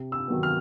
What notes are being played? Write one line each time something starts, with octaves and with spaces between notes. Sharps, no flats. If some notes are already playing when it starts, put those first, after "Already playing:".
Already playing: C3
E6
D#3 F#3 B3
F6